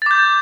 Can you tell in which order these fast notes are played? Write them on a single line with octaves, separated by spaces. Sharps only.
A6 D6 G6